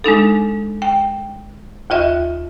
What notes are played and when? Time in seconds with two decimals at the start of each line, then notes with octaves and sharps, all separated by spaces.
0.04 G#3 D4 D#4 A4
0.82 G5
1.90 D#2 F4 D#5 E5